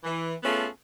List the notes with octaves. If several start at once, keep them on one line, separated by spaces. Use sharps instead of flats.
E3
A3 B3 C#4 F4 G#4 A4